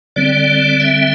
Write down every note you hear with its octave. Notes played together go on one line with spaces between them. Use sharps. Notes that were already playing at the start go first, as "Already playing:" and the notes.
D3 G3 C4 D5
E5